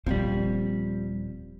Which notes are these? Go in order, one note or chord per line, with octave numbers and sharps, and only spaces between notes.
D#1 F3 G3 C4